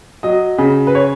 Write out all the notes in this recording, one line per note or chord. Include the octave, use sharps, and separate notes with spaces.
F#3 D#5
C#3
B4
C#5